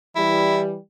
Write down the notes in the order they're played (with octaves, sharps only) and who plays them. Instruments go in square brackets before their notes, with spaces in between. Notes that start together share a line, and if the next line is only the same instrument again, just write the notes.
[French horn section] E3 G3 [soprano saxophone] E4